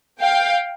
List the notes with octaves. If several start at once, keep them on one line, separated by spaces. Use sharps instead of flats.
F5 G5